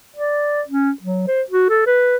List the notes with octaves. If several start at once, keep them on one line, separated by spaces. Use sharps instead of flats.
D5
C#4
F#3
C5
F#4
A4
B4